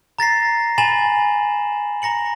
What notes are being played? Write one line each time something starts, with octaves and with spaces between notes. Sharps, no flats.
A#5 A6 A#6 C7
G#5 B5 A6 E7 F#7
A#5 A#6 C#7 F#7